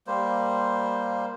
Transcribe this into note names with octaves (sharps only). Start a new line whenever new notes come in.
G3 A#3 C5